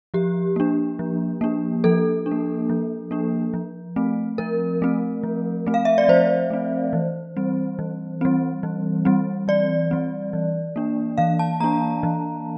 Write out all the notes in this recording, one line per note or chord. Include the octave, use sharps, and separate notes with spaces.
F3 G4
A#3 D4
F3
A#3 D4
F3 A4
D4
A#3
F3
A#3 D4
F3
A3 C4
F3 A#4
A3 C4
F3
A3 C4
F5
E5
D5
F3 C5
A3 C4
E3
G3 C4
E3
G3 C4
E3
G3 C4
E3 D5
G3 C4
E3
A#3 D4
E3 F5
A5
A#3 D4 A#5
E3